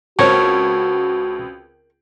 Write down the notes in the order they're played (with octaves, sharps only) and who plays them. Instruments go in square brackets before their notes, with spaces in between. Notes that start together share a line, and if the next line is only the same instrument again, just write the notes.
[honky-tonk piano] C#2 C4 [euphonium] F#4 [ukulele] A#4 C#5 [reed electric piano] A5 C#6 G#6